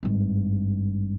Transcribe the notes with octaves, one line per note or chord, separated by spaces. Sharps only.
G#1 G2